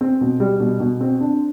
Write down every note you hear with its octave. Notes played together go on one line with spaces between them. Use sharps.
C4
B2
G3
B2
B2
C4
D4